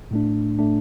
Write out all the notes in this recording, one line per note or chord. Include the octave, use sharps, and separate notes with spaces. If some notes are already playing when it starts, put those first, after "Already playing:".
A2 A3 D4
A2 A3 D4